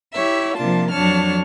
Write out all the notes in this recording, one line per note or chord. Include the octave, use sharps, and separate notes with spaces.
E4 G4 C#5 E5
C3 F3 A#3 D4 F4 A5
F2 F#3 D4 C#5 A5 F6